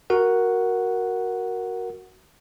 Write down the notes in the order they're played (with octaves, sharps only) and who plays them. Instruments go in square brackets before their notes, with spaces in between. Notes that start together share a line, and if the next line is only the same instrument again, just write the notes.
[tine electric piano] F#4 A#4 F#5